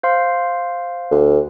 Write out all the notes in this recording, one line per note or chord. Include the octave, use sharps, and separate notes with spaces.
C5 F5 C6
D2